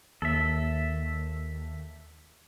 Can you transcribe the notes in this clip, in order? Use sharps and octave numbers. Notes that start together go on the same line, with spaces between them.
D#2 A4 E5